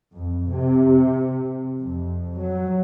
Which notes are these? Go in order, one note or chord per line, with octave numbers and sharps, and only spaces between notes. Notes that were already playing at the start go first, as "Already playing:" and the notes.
F2
C3
F2
F#3